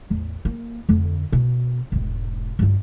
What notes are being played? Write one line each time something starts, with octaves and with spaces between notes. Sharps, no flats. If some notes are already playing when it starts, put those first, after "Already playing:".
A1 E2
A#3
F2 D3
B2
E1 G#2
G2 F4